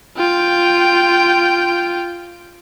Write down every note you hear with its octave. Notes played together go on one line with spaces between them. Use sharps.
F4 G5